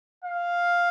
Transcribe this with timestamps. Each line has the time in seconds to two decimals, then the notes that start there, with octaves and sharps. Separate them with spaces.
0.24 F5